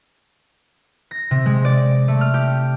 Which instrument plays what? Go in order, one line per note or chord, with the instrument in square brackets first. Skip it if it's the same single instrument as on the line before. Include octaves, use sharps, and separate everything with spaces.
[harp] A#6
C3
G#3
D5
A3
F6
G4